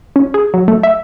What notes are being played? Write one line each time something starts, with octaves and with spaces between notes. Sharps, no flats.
C#4
G#4
F#3
A3
E5